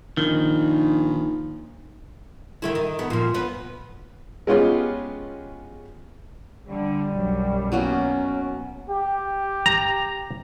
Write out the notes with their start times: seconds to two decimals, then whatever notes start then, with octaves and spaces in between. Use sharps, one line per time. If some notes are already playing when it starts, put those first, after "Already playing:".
0.17 A#1 D#3
2.62 D#3 A3 E4
2.75 D#3
2.99 B3 A4
3.10 A#2 F3
3.34 B3 B4
4.47 G#3 B3 C#4 F4 G4 G#4
6.67 D3 G3
7.12 B1 F#2
7.72 B2 F#3 A#3 C#4
8.90 G4
9.66 A#5